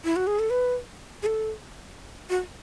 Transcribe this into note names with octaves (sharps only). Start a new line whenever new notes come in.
E4
F#4
G#4
A4
B4
G#4
A4
F#4